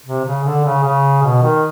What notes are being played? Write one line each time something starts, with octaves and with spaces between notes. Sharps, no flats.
C3
C#3
D3
C#3
C#3
B2
D#3